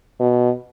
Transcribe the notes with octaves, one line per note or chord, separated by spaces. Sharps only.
B2